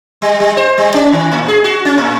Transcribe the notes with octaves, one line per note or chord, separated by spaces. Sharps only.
G3
G3
C5
G3
C#4
D#3
A2
G#4
F#4
C#4
A2